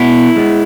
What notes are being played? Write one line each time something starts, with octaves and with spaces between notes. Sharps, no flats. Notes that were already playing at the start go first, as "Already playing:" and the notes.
Already playing: B2 E4
G#3